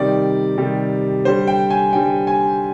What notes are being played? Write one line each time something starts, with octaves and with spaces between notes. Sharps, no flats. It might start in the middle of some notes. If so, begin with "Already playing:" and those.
Already playing: C3 D#3 G3 D5
C3 D#3 G3
D3 G3 C5
G5
G#5
D3 G3 G5
G#5